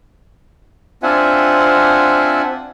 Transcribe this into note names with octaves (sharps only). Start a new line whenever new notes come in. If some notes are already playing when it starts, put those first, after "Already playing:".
C4 D4 F4 E5 F#5 G#5